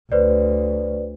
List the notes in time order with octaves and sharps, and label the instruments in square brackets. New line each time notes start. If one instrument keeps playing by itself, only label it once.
[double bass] D2 [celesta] B4 C5 D5